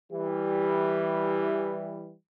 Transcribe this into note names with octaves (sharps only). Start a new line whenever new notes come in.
E3 G3 G4